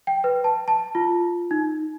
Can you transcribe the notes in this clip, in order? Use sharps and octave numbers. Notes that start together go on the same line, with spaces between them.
G5
B4
A5
A5
F4
D#4